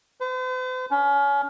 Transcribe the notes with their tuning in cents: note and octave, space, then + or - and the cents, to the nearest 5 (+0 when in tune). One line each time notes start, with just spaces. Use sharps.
C5 -45
C#4 +30